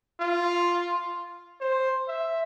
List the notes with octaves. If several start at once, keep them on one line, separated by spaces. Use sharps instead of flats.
F4
C5
E5